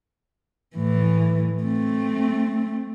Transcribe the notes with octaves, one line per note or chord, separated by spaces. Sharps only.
A2 E3
A3 C4